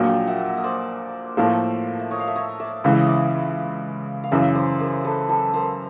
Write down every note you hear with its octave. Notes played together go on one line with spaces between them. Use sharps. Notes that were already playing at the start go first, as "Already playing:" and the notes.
Already playing: A#1 A#2 F#3 A#3
F5 G5
E5 F#5
D#5
C5 D5
A2 F3 A#3
E5
C#5 D#5
F5
E5
C#5 D#5
D5 E5
C#2 C#3 E3 F5
E5
D#5
D5 E5
F5
F#2 C#3 E3 D5 E5
C5 D5
G#4 A#4
A4 B4
A4 B4
A#4 C5